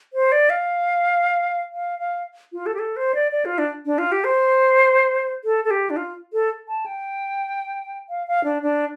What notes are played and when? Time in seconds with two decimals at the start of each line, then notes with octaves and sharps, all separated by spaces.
0.13 C5
0.32 D5
0.50 F5
1.73 F5
1.99 F5
2.53 F4
2.66 A4
2.74 G4
2.79 A4
2.96 C5
3.15 D5
3.32 D5
3.45 F4
3.58 D4
3.85 D4
3.98 F4
4.12 G4
4.24 C5
5.44 A4
5.64 A4
5.71 G4
5.90 D4
5.97 F4
6.33 A4
6.68 A5
6.86 G5
8.09 F5
8.27 F5
8.44 D4
8.62 D4